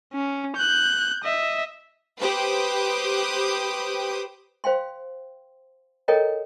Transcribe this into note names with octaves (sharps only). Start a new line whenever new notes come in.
C#4
F#6 G6
D#5 E5
G4 B4 C5 G5 D6 D#6
C5 F5 G5 C6
A4 A#4 C#5 D#5 G5 A#5